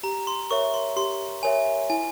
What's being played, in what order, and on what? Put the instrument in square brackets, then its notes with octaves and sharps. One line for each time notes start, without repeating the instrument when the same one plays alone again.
[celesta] G4 [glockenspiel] A#5
[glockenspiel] C6
[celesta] A#4 C#5 E5 [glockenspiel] C#6
[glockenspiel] C6
[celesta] G4 [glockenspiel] C6
[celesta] A#4 C#5 E5 [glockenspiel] G#5
[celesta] E4 [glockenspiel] G#5